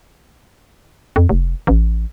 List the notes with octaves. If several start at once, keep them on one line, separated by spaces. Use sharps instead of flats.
F2
F1
A1